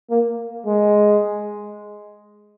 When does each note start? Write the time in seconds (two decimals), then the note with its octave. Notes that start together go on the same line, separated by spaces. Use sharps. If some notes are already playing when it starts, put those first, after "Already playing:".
0.10 A#3
0.66 G#3